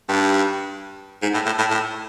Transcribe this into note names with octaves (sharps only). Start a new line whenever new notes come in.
G2
G#2
A2
A2
A2
A2